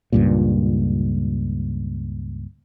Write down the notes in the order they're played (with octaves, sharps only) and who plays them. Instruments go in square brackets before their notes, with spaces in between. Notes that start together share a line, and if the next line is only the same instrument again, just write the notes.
[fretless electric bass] C#2 G2 A#2